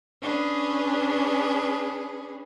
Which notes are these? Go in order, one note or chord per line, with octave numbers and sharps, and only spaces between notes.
C#4 D4 G#4 B4